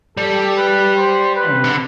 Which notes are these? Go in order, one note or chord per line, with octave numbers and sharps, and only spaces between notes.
G3 A4
B4
C5
B4
C3
D3